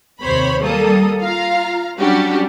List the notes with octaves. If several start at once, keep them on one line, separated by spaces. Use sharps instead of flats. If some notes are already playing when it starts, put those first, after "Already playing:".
D#2 C3 C5 C#5 B5
G3 A#3 A4 D#6
F4 F5 A#5
F#3 G3 C#4 D4 F#4 G4